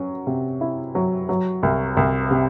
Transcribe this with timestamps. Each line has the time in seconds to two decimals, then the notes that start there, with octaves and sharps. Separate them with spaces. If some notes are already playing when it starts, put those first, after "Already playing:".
Already playing: F#3 C#4
0.27 C3
0.61 E4
0.95 F#3
1.29 F#3
1.63 C2
1.97 C2
2.31 C3